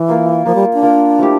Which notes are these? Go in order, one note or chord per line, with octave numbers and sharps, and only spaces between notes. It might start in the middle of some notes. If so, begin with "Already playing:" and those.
Already playing: E3
A#3 F4 A#4
F3 A#3 F4 A#4
G3
D4
A#3 F4 A#4
F3 A3 E4 G4